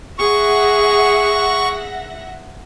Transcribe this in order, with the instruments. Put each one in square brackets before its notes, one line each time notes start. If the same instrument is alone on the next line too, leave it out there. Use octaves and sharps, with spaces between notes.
[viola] G#4 [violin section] E5 F#5 A#6 [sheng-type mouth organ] C#6